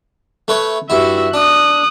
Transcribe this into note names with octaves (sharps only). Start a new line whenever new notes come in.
A3 B4 C#5
G2 E4 F#4 E5
D4 D#6 F#6